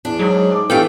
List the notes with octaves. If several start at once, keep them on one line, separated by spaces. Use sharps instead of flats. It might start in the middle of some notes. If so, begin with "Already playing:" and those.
E2 D4
G#2 F#3
A5 D6
E3 A3 B3 D4 G4 A4 F5 G5